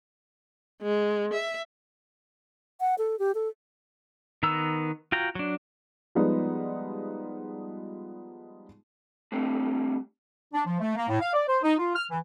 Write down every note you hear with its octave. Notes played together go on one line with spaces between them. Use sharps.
G#3
E5
F#5
A4
G4
A4
D#3 B3 A#5 E6
F4 F#4 G5 A#5
F#3 D4
F3 G3 G#3 B3 D#4
G3 A3 C4 D4
D4
F3
A3
A#3
A2
F5
D5
C5
D#4
F4
F6
E3